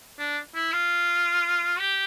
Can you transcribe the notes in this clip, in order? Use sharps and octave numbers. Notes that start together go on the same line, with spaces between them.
D4
E4
F4
G4